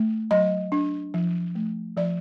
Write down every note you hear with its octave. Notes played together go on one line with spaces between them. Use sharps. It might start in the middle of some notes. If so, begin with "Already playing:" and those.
Already playing: A3
F#3 D#5
D4
F3
A3
F3 D5